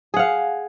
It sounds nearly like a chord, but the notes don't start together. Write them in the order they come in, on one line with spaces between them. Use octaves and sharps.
G#4 F#5 F5